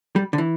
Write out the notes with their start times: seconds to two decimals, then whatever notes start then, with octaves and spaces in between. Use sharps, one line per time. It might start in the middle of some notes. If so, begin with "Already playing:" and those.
0.16 G3
0.33 D3
0.38 E3